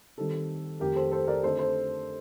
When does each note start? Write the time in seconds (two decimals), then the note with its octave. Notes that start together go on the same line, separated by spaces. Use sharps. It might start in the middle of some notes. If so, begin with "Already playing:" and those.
0.18 D#3 G3 C4 A4
0.80 F2 D#3 A3 G4 A#4
0.96 A4 C5
1.12 A4 C5
1.27 A#4 D5
1.43 D3 A3 C4 D#4 A4 C5
1.59 A4 C5